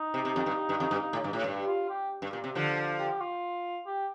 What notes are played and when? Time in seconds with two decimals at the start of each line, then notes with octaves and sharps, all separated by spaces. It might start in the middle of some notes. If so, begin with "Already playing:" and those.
Already playing: D#4
0.14 C3
0.25 C3
0.36 F2
0.46 G2
0.69 G2
0.80 F2
0.91 G2
1.13 A2
1.24 G2
1.33 A2
1.44 G2
1.67 F4
1.90 G4
2.22 G2
2.33 A#2
2.44 C3
2.55 D3 F3
2.99 G4
3.20 F4
3.86 G4